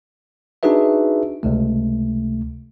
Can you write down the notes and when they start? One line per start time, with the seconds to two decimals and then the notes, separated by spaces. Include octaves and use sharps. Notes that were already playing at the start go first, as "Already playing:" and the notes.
0.63 D4 D#4 F#4 G#4 B4 E5
1.43 C#2 C3 A3